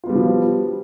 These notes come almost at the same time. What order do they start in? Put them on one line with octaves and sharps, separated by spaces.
F4 B3 G3 F#4 F3